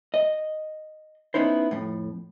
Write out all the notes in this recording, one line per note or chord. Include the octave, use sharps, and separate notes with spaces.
D#5
B3 C#4 D#4 E4 C5
F2 A2